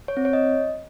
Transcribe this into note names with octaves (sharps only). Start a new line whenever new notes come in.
C#5
C4
C#5
D#5